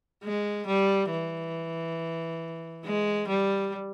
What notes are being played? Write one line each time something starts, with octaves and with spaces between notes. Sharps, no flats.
G#3
G3
E3
G#3
G3